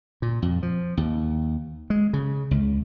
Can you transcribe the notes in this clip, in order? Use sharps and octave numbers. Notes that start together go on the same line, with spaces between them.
A#2
F2
F3
D#2
G#3
C#3
C#2